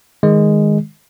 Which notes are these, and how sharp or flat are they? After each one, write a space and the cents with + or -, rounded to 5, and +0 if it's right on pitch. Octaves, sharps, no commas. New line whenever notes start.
D#3 +0 G#3 -5